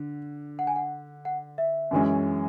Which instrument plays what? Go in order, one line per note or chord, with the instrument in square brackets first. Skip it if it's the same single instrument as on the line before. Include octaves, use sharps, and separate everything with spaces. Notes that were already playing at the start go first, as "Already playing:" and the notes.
Already playing: [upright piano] D3
[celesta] F#5
G#5
F#5
F#5
E5
[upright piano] F#2 E3 G#3 C#4